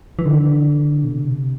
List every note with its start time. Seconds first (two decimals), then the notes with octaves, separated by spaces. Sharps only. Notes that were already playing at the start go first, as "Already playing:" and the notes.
0.19 E3
0.26 D3
1.04 B2
1.10 C3